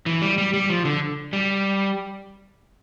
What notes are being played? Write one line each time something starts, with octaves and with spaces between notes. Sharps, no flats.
E3
G3
G3
G3
F3
D3
G3